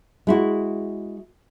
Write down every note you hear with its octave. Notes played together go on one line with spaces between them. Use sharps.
G#3 E4 F#4